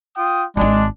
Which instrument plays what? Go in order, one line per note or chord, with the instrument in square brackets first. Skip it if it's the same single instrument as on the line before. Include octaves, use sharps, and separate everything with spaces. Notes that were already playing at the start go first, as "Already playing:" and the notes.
[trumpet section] F4 G5 D#6
[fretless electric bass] D1 G#1 [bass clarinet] G#3 [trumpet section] D4